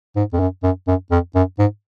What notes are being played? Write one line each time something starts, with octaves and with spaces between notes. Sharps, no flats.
G#2
F2
F#2
F#2
F#2
F2
F#2
G#2